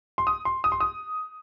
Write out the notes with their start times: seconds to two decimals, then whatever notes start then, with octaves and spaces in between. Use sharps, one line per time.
0.18 C6
0.27 D#6
0.45 C6
0.64 D#6
0.72 C6
0.80 D#6